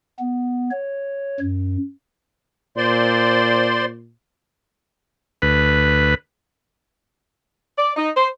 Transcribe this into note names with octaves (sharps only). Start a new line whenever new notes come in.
B3
C#5
F#2
A#2 C5 D5 C6
D2 B4
D5
D#4
C5